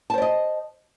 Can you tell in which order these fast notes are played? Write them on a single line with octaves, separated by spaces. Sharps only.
A5 C5 D5 D#5